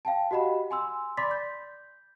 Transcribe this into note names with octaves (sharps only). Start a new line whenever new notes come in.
F5 G5 A5
F#4 G4 D#5 F#5 B5
G#5 C6 E6
D5 B5 C6 D6 A6 B6
G6